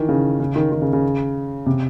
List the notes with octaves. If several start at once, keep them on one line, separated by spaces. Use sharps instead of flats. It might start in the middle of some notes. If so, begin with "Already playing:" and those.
Already playing: D#3 E3
C#3
C#3
D#3
D#3
C#3
C#3
C3